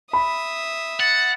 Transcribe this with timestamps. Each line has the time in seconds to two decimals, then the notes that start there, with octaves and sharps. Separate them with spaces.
0.13 E5 B5 D#6
1.00 F#5 A6